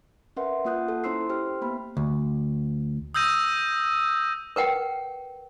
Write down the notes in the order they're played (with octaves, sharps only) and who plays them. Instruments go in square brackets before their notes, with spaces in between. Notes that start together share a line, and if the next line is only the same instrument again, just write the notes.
[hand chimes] C#4 A#4 B4 E5 F#5 C6
A#3 F4 F#5 D#6 F#6 G6
A4
C#4 E4 C5 C6 E6 C7
G4 C5 G5 F6
A#3 B3 B5
[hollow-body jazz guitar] D2
[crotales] D#6 E6 G6 A#6 D#7
[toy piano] A#4 B4 F#5 G5